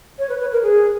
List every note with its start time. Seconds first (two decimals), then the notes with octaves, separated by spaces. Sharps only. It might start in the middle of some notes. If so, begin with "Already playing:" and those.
0.19 C#5
0.29 B4
0.40 B4
0.52 A#4
0.63 G#4